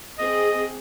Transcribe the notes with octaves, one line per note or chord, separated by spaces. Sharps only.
C4 G#4 D#5